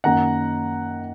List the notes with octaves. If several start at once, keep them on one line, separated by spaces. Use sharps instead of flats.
F#2 D#3 A#3 F#5 A#5